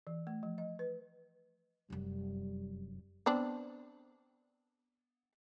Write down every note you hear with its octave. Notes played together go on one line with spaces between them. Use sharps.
E3
A3
F3
D#5
B4
F1 F#2 G3
B3 C4 D4